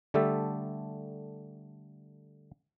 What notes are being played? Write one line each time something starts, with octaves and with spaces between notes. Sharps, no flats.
D3 G3 A3 G4 A4 E5